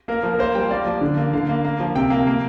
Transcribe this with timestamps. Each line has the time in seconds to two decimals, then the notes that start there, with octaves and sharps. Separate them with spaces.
0.08 A#3 A#4
0.23 F3
0.34 A#4
0.39 A#3 C5
0.55 G3 G5
0.63 F5
0.71 A#3 D5
0.86 F3
1.01 D3
1.17 A#3
1.33 D3 F5
1.49 A#3
1.65 A#3
1.80 F3
1.95 C3 G5
2.10 A#3
2.27 A#3